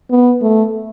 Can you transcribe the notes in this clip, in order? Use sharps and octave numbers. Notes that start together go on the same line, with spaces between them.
B3
A3